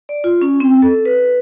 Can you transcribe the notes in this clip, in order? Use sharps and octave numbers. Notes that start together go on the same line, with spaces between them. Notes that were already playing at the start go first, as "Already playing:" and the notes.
D5
F4
C#4
C4
A4
B4